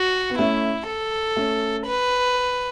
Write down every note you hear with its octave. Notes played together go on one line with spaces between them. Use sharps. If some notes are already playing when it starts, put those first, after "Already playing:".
Already playing: F#4
B3
A3 C#4 E4
A4
A3 C#4
B4